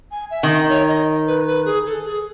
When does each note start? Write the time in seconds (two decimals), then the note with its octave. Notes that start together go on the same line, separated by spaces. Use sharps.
0.12 G#5
0.31 E5
0.43 D#3
0.50 D#5
0.69 C#5
0.89 D#5
1.27 B4
1.47 B4
1.65 G#4
1.86 A4
2.05 G#4